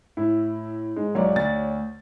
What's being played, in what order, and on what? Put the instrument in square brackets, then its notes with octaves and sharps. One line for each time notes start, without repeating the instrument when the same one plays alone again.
[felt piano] A2 [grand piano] E4
[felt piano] G#2 [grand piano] G#3
[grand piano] B1 G#2 [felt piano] C#5 D5
[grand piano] D2 A6